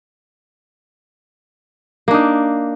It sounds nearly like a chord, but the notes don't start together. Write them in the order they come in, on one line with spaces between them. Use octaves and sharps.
A#3 D4 D#4